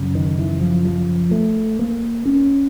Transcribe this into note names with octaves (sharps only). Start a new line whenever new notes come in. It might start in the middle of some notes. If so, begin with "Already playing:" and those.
Already playing: F#2 C#3
D#3
E3
F3
F3
A3
A#3
C#4